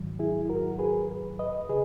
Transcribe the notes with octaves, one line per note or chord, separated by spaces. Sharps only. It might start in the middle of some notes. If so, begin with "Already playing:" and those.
Already playing: G#2 D#3 F#3
E4 G#4
F#4 A#4
G#4 B4
B4 D#5
C#3 G#4 B4